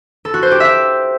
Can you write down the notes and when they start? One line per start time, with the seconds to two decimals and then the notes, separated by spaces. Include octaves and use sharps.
0.25 A4
0.34 F#4
0.43 C5
0.51 G4
0.60 E5